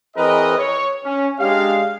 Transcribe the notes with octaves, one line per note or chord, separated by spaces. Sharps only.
E3 C4 G#4 A#4 B4 D#5
C#5
C#4
G#3 D4 G4 F5